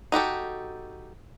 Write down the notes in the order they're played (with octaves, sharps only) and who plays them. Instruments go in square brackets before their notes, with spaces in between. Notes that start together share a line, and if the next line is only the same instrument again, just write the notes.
[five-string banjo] D#4 F#4 G4 A4